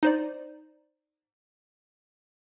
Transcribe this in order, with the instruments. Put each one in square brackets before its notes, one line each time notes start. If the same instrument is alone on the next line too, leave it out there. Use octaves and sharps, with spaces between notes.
[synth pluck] D#4 C5 D5